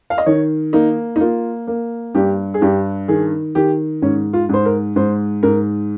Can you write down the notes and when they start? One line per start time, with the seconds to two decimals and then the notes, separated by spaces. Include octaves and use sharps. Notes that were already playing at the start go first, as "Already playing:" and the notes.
0.10 F5
0.18 D#5
0.26 D#3 C#5
0.73 A#3 D#4
1.16 D#4
1.20 A#3 F4
1.67 A#3
2.15 G2 G4
2.54 G#4
2.61 G2 G4
3.08 D#3 G#4
3.55 D#3 G4
4.02 G#2 C#4
4.33 F4
4.49 G#2 C5
4.65 A#4
4.96 G#2 C5
5.43 G#2 A#4